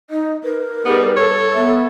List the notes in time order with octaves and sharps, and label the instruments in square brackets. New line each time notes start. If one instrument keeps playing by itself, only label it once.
[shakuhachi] D#4 [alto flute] D#5
[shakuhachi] A#4 [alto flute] B4
[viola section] G3 D#4 G#4 [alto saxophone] B3
[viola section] A4 [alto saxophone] C#5
[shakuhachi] B3 [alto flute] E5